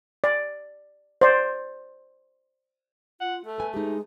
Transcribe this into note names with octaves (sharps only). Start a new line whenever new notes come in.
D5
C5 D5
F4 F#5
A3 A4
B4 G#5
G#3 D#4 G4